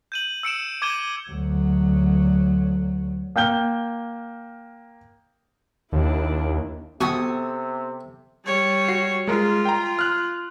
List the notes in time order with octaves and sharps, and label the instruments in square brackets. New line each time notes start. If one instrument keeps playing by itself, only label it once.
[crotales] G6 D#7 F#7
E6 C#7 D7 E7
D6 G#6 D#7 G7
[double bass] D2 F#3
[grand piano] A#3 G5 G6 G7
[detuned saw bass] D#2 [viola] D4 E4
[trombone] C3 [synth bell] B3 [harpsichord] F#4 [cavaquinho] A4 G#5 D#6
[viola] G3 C#5
[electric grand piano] F#4 C7
[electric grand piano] G#3 A#4 [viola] F4
[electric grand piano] G5 A#5
F6 F#6